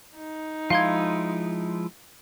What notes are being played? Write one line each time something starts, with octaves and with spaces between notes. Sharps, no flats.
D#4
F3 G#3 E4 F5 C6 G#6